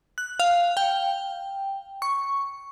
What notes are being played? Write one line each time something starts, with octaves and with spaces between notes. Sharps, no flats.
F#6
F5
G5
C#6